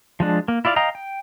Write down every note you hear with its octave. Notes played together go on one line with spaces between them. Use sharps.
F3 G#3 D4
A#3
E4 F4 D5 F5
D#5 F5 G5 A#5 D#6
G5